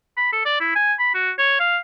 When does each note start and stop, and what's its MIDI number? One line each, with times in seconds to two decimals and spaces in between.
0.17 0.28 83
0.33 0.45 69
0.46 0.60 74
0.61 0.71 64
0.76 0.94 80
1.00 1.12 83
1.14 1.31 66
1.38 1.58 73
1.60 1.78 77